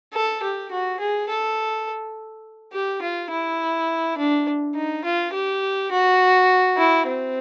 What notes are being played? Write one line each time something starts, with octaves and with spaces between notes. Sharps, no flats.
A4
G4
F#4
G#4
A4
G4
F4
E4
D4
D#4
F4
G4
F#4
E4
C4